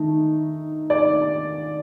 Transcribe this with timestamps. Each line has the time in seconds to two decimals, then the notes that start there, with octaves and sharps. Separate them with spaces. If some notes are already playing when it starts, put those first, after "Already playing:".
Already playing: D#3 A3 D#4
0.90 D5